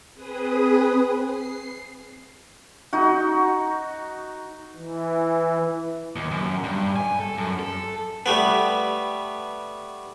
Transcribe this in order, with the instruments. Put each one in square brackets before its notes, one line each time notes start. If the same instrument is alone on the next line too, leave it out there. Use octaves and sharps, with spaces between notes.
[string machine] C4 G#4 B4 D#6
C7
[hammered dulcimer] D#4 F#4
[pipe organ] E3
[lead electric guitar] D#2
F#2
G2
G#5
A4
F#2
A4
[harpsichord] G3 A3 B3